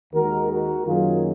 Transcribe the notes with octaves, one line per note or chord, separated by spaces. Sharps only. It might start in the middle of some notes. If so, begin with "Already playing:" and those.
D#2 D#3 G#3 F#4 A#4
F#4 A#4
F#2 D#3 F#3 A#3 F4 G#4